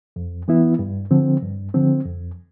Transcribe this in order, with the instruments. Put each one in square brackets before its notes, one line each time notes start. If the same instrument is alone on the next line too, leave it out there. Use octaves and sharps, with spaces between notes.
[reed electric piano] F2
E3 B3 E4
G2
D3 F3 C4
G2
D3 F3 C4
F2